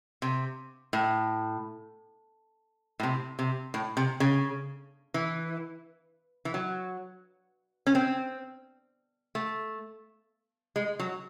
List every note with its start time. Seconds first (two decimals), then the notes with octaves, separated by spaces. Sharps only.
0.22 C3
0.93 A2
3.00 A2
3.03 C3
3.39 C3
3.74 A2
3.97 C3
4.20 C#3
5.14 E3
6.45 E3
6.54 F#3
7.87 C#4
7.95 C4
9.35 A3
10.76 G#3
10.99 F#3